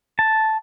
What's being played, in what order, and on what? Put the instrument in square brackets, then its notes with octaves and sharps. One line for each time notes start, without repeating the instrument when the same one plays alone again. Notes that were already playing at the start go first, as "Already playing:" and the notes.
[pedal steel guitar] A5